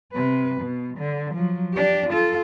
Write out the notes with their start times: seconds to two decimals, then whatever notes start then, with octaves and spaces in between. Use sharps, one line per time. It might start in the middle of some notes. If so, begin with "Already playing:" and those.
0.13 C3 B4
0.61 B2
0.97 D3
1.34 F3 F#3
1.74 D4 G4
2.09 F4 A4